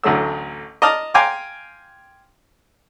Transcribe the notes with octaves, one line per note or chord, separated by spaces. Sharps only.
A1 D2 F#3 A3 E6
D#5 A5 A#5 D6 D#6 F6
F5 G5 G#5 A#5 C6 D6